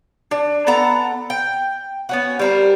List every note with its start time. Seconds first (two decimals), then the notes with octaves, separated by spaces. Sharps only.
0.31 D4
0.67 B3 A4 F#5 A#5
1.30 G5
2.09 B3 C#4 F#4
2.39 G3 C4 A#4